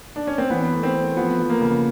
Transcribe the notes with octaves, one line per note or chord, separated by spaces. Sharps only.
D4
C#4
C4
E3 B3
A3
C4
A3
F3 B3
F3
A#3
C#3